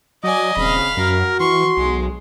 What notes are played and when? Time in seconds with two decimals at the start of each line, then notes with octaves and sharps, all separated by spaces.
0.24 F#3 D5 D#5 G#5
0.57 D#1 C#3 C4 F5 B5
0.97 F#2 F#4 A#4
1.40 E3 C6 C#6
1.77 B1 G#3